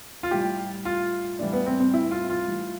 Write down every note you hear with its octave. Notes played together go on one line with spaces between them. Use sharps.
F4
A2 G3 G4
F4
A2 E3 G3 D4
B3
C4
C4
E4
F4
F4
A2 E3 G3